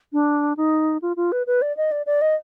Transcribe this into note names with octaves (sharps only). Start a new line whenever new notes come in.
D4
D#4
F4
F4
B4
B4
D5
D#5
D5
D5
D#5